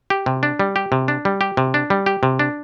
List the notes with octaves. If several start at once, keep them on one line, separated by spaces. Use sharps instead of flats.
G4
C3
D4
G3
G4
C3
D4
G3
G4
C3
D4
G3
G4
C3
D4